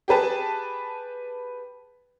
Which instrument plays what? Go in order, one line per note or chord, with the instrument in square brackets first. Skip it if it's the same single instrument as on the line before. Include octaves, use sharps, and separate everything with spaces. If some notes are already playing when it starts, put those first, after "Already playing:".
[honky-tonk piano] G4 G#4 B4 A5